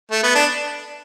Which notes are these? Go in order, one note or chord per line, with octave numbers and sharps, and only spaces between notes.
A3
B3
D4